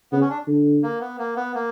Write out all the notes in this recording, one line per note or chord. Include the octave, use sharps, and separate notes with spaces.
C#3 B3
C#4
D4
D3
A#3
B3
A#3
B3
A#3